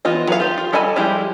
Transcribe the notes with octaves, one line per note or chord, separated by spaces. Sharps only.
E3 B3 F4 D#5
F#3 B4 F5
F4 G4
F4
G3 A4 D#5 G#5 B5
F3 G3 G#3 E4 G4